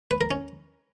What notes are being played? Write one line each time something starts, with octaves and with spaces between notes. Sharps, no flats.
B4
A#4
C#4